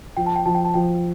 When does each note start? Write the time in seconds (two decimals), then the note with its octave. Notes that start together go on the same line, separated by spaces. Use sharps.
0.17 F3 G5
0.26 A5
0.36 G5
0.46 F3 A5
0.55 G5
0.65 A5
0.74 F3 G5